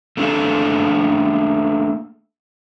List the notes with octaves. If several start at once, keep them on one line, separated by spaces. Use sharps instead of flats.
A3 A#3 D4 G#4 A4 F5